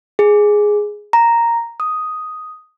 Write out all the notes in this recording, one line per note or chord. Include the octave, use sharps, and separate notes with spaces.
G#4
A#5
D#6